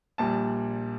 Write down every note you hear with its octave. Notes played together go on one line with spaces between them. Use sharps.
A#1 A#2 G3 A5